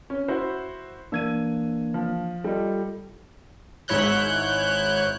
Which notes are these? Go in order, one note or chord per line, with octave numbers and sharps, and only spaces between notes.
C#4
E4 F#4 C5
E3 A#3 D4 E6 G#6 D#7
F3
G3 D#4 F4 A4
G#1 G#2 E4 C#5 F#6 G6